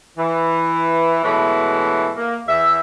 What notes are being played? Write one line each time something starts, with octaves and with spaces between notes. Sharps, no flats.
E3
B2 E3 F#3 G#3 A3
A#3
E2 E5